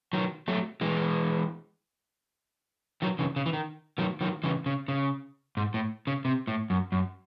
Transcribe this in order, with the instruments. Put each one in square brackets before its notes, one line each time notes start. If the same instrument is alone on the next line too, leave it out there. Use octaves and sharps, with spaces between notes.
[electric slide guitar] D#3 F#3
F#3 A3
E3 G#3
D#3 F#3
C#3 E3
C#3
E3
D#3
D#3 F#3
D#3 F#3
C#3 E3
C#3
C#3
G#2
A2
C#3
C3
A2
F#2
F#2